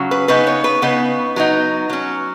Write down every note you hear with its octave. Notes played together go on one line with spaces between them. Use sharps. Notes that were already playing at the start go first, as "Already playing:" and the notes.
Already playing: C#3 F#3 C#4
B4
C#3 B3 D#4 B4
C#5
B4
C#3 B3 D#4 B4
F#3 B3 D#4
F#3 C#4